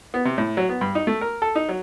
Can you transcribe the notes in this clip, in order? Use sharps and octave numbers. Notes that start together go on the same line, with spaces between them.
B3
C3
A2
F#3
B3
G2
D#4
A3
A#4
A4
D#4
F#3